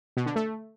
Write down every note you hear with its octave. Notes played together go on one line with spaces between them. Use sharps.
B2
D3
A3